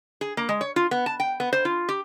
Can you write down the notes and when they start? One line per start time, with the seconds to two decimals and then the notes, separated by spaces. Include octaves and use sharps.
0.21 G#4
0.37 A#3
0.49 G#3
0.61 C#5
0.76 F4
0.91 B3
1.06 A5
1.20 G5
1.40 B3
1.53 C5
1.65 F4
1.89 G4